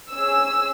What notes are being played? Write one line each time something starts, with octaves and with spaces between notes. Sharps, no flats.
C#4 G#4 E6